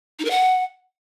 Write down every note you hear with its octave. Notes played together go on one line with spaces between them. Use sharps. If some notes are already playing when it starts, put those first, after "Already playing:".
D#4
A#4
F#5